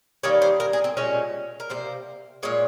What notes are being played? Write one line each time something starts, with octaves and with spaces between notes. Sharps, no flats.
D#3 G3 A#3 C#5
C5
A#4
G#4
C4
A#2 G#3 C#4
A#4
C3 G3 A#3 C5
A#2 G#3 C#5